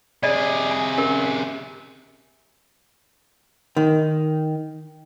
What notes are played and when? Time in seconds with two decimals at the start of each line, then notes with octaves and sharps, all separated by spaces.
0.23 C3 G#4 D5 D#5
0.71 G#5
0.98 C#4 G4 A#4
3.77 D#3